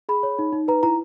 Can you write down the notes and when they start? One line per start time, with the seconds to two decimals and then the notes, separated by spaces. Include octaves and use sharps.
0.09 G#4 B5
0.23 C#5
0.39 D#4
0.53 D#4
0.68 B4 A#5
0.83 E4 A#5